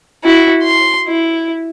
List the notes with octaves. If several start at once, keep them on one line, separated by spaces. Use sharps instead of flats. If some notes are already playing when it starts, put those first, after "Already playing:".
E4 F#4
C6
E4